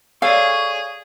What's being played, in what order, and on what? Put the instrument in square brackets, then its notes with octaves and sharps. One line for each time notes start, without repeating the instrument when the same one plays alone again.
[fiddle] G#4 [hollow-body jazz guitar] A4 C#5 D5 [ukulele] F5 [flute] C#6